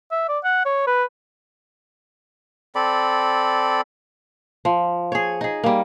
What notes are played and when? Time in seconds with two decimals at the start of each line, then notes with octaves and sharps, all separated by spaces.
0.12 E5
0.29 D5
0.44 F#5
0.66 C#5
0.87 B4
2.75 C4 A4 D5 B5
4.65 F3
5.12 G#4 C#5
5.41 D#4 G#4
5.64 G3 A#3